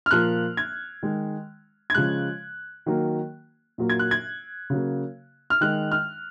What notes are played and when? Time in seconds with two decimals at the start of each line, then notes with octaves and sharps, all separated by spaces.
0.06 F6
0.11 A#2 F3 A#3 F#6
0.57 G#6
1.03 D#3 G#3
1.90 G#6
1.95 C#3 F3 G#3 F#6
2.86 D#3 F#3 A#3
3.78 A#2 F#3 A#3
3.90 G#6
3.99 F#6
4.11 G#6
4.70 C#3 F#3 A#3
5.50 F6
5.61 D#3 G#3 F#6
5.92 F6